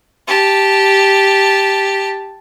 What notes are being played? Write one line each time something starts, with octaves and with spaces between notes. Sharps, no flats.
G4 A5